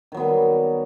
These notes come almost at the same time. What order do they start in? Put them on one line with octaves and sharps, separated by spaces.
D#3 F#3 B3 G3